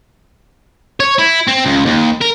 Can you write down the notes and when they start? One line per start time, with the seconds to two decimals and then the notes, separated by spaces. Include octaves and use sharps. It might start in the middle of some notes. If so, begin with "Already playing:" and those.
1.00 C#5
1.19 E4
1.48 C4
1.66 C#2
1.85 D#2
2.21 A#4